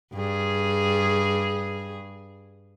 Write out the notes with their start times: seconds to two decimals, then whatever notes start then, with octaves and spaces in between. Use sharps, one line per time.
0.14 G2 G#4